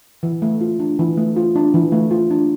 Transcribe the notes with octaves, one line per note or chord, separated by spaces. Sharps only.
E3
A3
F4
D4
E3
A3
F4
D4
E3
A3
F4
D4